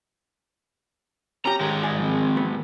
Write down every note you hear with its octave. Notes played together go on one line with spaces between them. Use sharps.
C#4 G4 A#5
D#3 G#3
G#4 D5 E5
F3 C4
D#2 B3